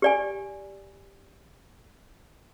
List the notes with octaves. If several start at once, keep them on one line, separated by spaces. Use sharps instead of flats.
G4 D5 G#5